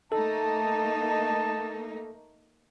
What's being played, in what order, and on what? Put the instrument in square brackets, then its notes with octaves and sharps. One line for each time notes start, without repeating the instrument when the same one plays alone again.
[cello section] A3 A#3 D#4 [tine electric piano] A4 [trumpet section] D#5 A5